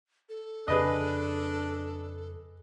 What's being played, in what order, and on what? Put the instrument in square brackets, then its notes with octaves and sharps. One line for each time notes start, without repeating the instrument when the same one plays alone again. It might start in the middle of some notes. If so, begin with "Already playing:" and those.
[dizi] A4
[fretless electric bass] F2 C#3 C4 [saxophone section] D4 [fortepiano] G#4 B4 D#5